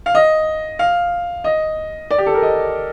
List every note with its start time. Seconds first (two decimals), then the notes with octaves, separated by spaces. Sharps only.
0.06 F5
0.15 D#5
0.79 F5
1.44 D#5
2.11 D5
2.18 G4
2.26 A4
2.34 A#4
2.43 D#5